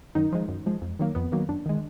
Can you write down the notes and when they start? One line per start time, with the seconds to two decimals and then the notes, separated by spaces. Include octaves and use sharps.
0.15 F#2 D#3 D#4
0.33 F3 G#3
0.48 F#2
0.66 F3 G#3
0.82 F2
0.99 D#3 F#3 A#3
1.15 F2 B3
1.32 D#3 F#3 A#3
1.49 F#2 D4
1.66 D#3 G#3